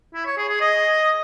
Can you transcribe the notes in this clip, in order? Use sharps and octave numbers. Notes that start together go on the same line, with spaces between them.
E4
C#5
G#4
G#4
D#5